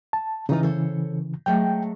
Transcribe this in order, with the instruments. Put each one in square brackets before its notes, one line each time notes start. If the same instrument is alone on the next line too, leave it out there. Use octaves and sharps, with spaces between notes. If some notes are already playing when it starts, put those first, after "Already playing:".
[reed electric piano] A5
[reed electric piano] C#3 E3 [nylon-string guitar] D#4 F4
[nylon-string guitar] A4 C5 C#5
[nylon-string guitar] F#3 G#3 A3 [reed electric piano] G5